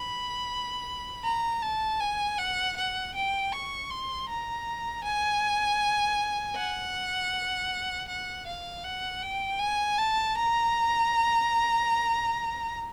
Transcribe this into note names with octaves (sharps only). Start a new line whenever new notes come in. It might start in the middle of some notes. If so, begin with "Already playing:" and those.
Already playing: B5
A#5
A5
G#5
F#5
F#5
G5
C#6
C6
A#5
G#5
F#5
F#5
F5
F#5
G5
G#5
A5
A#5